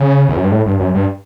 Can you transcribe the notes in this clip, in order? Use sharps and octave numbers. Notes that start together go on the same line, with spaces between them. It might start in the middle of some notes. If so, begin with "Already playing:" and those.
Already playing: C#3
E2
F#2
G2
A2
G2
F#2
G2